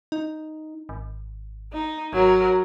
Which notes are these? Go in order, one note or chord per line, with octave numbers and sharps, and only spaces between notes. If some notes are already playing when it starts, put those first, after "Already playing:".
D#4
G#1
D#4
G#1 F#3 A#4